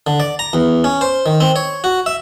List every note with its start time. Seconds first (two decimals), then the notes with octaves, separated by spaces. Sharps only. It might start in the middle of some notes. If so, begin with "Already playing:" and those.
0.07 D3
0.20 D5
0.39 A#5
0.53 E2
0.84 C#4
1.01 C5
1.26 D#3
1.40 C4
1.56 C#5
1.84 F#4
2.06 E5